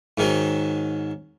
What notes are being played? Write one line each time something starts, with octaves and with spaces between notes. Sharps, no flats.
G#2 D#3 F#3